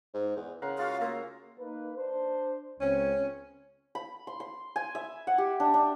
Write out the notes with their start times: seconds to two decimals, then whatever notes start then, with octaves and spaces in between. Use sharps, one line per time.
0.14 G#2
0.36 E2
0.62 C#3 A#4 F#5 C6
0.77 G#3 F4 F#4 F5
1.01 A#3 E5 A#5 C6
1.59 A#3 D#4 B4
1.97 D4 C5
2.80 C#2 C4 C#4
3.95 B5
4.27 C6
4.40 C6
4.76 G#5
4.95 E5
5.27 F#5
5.38 G4
5.60 D4
5.74 D4